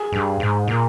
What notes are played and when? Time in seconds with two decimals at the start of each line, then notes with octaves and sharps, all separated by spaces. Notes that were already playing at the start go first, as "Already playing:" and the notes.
Already playing: G#4
0.12 G2
0.40 G#2
0.68 A#2